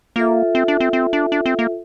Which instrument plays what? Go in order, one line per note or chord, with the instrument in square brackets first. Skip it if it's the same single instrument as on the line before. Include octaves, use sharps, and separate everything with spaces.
[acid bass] A#3 [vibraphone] F4 A4 E5
[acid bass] C4
D4
C4
C4
D4
D4
C4
A#3